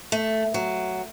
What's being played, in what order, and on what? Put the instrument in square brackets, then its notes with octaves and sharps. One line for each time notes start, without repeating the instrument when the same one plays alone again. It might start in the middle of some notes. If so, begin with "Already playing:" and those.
[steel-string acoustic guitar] A3
F#3